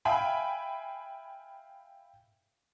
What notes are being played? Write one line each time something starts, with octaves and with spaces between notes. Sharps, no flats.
E5 F5 G5 G#5 B5